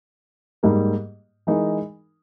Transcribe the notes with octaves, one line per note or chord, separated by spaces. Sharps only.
G#2 G3 A#3
E3 G#3 D#4 A#4